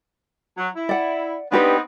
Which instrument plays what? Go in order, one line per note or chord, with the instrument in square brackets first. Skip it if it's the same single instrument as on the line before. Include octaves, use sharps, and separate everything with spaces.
[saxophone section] F#3
E4
[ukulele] D5 F#5
[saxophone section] B3 C4 D#4 [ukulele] D4 G4 B4